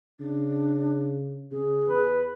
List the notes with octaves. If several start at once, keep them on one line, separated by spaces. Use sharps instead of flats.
C#3 D4
C#3 G#4
E2 B4